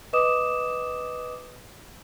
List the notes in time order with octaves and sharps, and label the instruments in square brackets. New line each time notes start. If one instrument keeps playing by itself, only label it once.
[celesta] B4 D#5 D6 D#6 E7